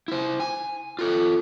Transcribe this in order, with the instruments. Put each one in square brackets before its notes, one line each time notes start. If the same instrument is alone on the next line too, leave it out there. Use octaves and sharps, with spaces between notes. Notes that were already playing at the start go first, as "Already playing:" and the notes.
[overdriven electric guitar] E4 C5
G#5
F4 A4